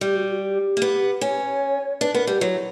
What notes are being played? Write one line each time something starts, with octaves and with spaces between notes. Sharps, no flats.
G3 G4
F#4
F#4
G4
A#3
B3
C#4 C#5
D4 B4
B3 A#4
G3 G4
F#3 E4